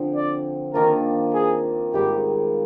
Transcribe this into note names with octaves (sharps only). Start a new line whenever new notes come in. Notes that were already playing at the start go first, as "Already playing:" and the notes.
Already playing: D3 F3 C4
D5
D#3 A#3 D4 F4 A#4
G#4
G#2 D#3 G3 G4